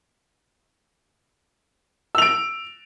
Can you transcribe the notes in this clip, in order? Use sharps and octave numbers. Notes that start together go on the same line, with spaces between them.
E6 D7 F7